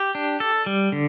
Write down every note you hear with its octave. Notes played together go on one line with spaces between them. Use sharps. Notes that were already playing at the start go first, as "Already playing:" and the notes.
Already playing: G4
D4
A4
G3
D3